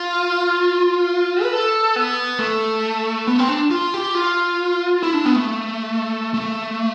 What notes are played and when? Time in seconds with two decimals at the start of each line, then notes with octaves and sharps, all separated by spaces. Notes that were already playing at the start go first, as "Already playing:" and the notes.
Already playing: F4
1.43 B4
1.53 A4
1.96 B3
2.39 A3
3.27 B3
3.39 C4
3.49 D4
3.71 F4
3.94 G4
4.15 F4
5.03 E4
5.14 D4
5.25 B3
5.36 A3
6.34 A3